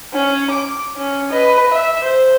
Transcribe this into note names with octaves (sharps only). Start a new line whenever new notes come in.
C#4
D6
C#4
B4 D#5
E5
C5